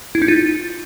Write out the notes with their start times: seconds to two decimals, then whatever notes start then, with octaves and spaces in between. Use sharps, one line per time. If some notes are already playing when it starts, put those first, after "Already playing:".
0.15 E4
0.22 D#4
0.28 F4